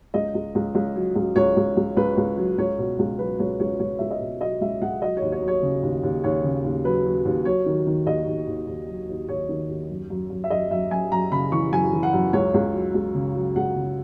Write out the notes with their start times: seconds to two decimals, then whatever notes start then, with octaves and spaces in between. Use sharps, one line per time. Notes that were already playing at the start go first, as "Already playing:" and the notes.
0.14 C#2 D#5
0.35 C#2
0.55 C#2
0.75 C#2
0.96 F#3
1.15 C#2
1.36 C#2 C#5
1.57 C#2
1.77 C#2
1.97 C#2 B4
2.17 C#2
2.38 F#3
2.58 C#2 C#5
2.78 B2
2.99 C#2
3.19 F#3 B4
3.39 C#2 C#5
3.60 C#2 C#5
3.80 C#2 C#5
3.99 C#2 E5
4.11 D#5
4.20 B2
4.40 F#3 D#5
4.61 C#2 E5
4.81 C#2 F#5
5.02 F#3 D#5
5.17 C#5
5.22 D#2
5.32 C#5
5.42 F#3
5.48 C#5
5.63 C#3
5.83 D#2
6.03 D#2
6.24 D#2 C#5
6.44 C#3
6.64 D#2
6.84 F#3 B4
7.05 F#3
7.25 D#2
7.45 F#3 C#5
7.66 D#3
7.87 D#3
8.06 D#2 D#5
8.27 D#2
8.47 D#2
8.68 D#2
8.88 F#3
9.09 D#2
9.29 D#2 C#5
9.49 D#3
9.69 D#2
9.90 F#2
10.10 F#2
10.30 F#2
10.44 E5
10.50 F#2 D#5
10.71 F#2 E5
10.91 F#2 G#5
11.11 F#2 A#5
11.32 C#3 B5
11.52 E3 C#6
11.72 F#2 G#5
11.93 E3
12.03 F#5
12.13 F#2
12.33 C#2 C#5
12.54 C#2
12.74 F#3
12.94 C#2
13.15 C#3
13.35 F#3
13.56 C#2 F#5
13.76 C#3